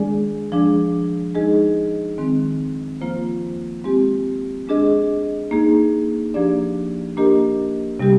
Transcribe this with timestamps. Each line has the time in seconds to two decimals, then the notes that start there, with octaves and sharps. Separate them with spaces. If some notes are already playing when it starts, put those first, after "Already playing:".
Already playing: D#3 G#3 D4 G#4 D5
0.52 F3 G#3 D4 G#4 D5
1.35 G#3 D#4 G#4 D#5
2.18 D#3 G#3 C4
3.01 F3 A#3 F4 C5
3.84 G#3 C4 G4
4.67 G#3 D4 G#4 D#5
5.51 A#3 D#4 G#4
6.34 F3 A#3 D4 G4 D5
7.17 A#3 D4 G4 A#4 D#5
7.99 C3 G3 C4 G4